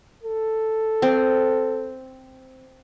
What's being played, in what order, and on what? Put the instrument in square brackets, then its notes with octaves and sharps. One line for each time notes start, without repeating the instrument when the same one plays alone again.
[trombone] A4
[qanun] C4